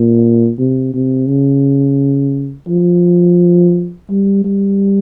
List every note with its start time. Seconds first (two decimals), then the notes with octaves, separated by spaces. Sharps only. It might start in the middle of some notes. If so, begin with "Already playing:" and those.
Already playing: A#2
0.59 C3
0.94 C3
1.28 C#3
2.68 F3
4.10 G3
4.44 G3